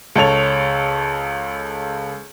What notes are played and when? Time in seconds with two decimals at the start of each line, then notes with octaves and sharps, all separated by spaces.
0.15 C#2 A4 C#5 F7